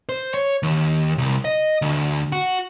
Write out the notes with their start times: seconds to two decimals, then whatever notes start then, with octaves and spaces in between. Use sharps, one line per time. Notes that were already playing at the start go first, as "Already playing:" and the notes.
0.09 C5
0.34 C#5
0.63 D#2
1.18 C2
1.45 D#5
1.82 D2
2.32 F#4